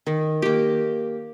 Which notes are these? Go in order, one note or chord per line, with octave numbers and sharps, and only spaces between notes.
D#3
A#3 G4